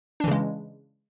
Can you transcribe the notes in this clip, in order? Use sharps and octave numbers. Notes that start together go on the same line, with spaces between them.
C#3 E3 G#3 D4